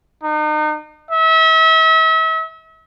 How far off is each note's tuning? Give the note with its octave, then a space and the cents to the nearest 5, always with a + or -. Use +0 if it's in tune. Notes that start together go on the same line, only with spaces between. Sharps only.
D#4 -35
E5 -40